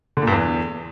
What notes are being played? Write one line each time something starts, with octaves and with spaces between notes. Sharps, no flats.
D3
A#2
G2
E2